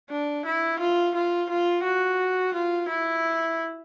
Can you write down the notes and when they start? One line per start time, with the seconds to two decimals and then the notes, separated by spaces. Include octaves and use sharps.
0.10 D4
0.46 E4
0.79 F4
1.15 F4
1.50 F4
1.84 F#4
2.54 F4
2.88 E4